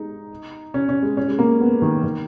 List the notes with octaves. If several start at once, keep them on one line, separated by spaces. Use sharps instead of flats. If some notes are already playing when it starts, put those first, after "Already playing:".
Already playing: G#3 D#4
C#4
C#4
G#3
C#4
G#3
A#3
B3
D#3
D#3